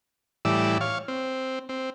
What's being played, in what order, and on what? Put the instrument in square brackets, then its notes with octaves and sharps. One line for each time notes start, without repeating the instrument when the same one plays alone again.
[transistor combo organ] A2 E3 G3 D5 E6
C#5 F5
C4
C4